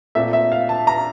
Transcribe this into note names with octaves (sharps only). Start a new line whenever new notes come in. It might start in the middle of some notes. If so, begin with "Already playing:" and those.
A#2 A3 C4 E5
E5
F5
A5
A#5